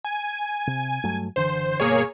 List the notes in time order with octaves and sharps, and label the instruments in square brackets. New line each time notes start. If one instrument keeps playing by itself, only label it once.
[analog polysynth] G#5
[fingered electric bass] C3
G2 F#3 A3
[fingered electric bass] F#1 D3 E3 [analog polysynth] C5
[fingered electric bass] G1 B2 [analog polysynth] A#3 G#4 C#5